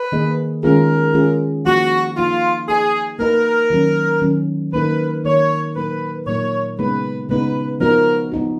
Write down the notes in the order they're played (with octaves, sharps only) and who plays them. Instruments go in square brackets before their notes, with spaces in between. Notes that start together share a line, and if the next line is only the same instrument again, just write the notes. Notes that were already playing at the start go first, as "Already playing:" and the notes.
Already playing: [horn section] B4
[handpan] D#3 A#3 D#4 G#4 D#5
[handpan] D#3 G#3 C#4 F4 G#4 [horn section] A#4
[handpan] D#3 G#3 C#4 F4 G#4
[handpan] F3 A#3 D#4 [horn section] F#4
[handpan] F3 A#3 D#4 [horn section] F4
[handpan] A#3 D#4 F#4 B4 D#5 [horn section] G#4
[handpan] A#3 D#4 F#4 B4 D#5 [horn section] A#4
[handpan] D#3 F#3 C#4
D#3 F#3 C#4
[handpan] D#3 A#3 D#4 A#4 [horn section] B4
[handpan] D#3 A#3 D#4 A#4 [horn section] C#5
[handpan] A#2 F#3 A#3 D#4 A#4 [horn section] B4
[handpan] A#2 F#3 A#3 D#4 A#4 [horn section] C#5
[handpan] C#3 G#3 B3 D#4 [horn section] B4
[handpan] C#3 G#3 B3 D#4 [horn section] B4
[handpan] F3 B3 D#4 F#4 [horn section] A#4
[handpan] F3 B3 D#4 F#4